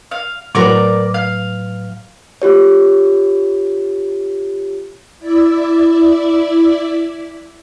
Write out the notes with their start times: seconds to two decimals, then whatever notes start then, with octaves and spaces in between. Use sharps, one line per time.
0.11 F5
0.55 A2 F#3 A#4 B4 D5 D6
1.14 F5
2.42 F4 G4 C#5
5.19 E4 D5 E5